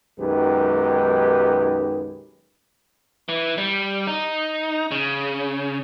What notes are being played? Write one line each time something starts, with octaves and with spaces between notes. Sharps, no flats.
B1 F#2 D#3 G#3 G4 B4
E3
G3
D#4
C#3